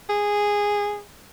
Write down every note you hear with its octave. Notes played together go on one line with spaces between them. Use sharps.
G#4